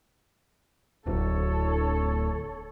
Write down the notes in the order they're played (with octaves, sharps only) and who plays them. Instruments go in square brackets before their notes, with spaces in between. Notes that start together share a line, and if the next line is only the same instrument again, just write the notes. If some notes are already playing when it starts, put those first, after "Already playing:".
[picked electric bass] D1 [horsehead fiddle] A4 C#5